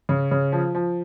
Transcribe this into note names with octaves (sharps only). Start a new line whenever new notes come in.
C#3
C#3
F3
F3